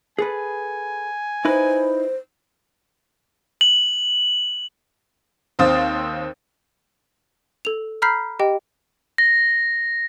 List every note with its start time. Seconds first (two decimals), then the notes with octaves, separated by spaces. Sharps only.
0.19 G#4 A4 B4 G#5
1.45 D#4 E4 B4 C5
3.61 F#7
5.59 D#2 C4 C5 F5 D#6 A6
7.65 A4 F7
8.02 A#5 B5 F6 G6 B6 C7
8.39 G4 D#5 G5
9.18 A#6